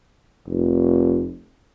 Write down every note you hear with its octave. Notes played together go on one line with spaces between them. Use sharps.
F1